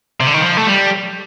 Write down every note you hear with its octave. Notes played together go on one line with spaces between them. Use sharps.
C3
D3
D#3
F3
A3
G3